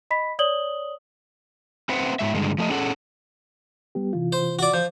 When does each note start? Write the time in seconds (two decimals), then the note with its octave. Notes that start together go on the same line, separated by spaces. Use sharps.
0.11 D#5 B5 B6
0.39 C#5 D5 D#6 F#7 G7
1.89 C4 B4 C5 E5 F#5
2.19 G#2 G#3 E5
2.34 G2 D3 G#3
2.58 F3 A3 D#5
2.71 C#4 G#4 A4 C#5 F#5
3.95 G3 B3 G4
4.13 C3 E3 F4
4.32 C5
4.59 F#4 D5
4.74 F3 G6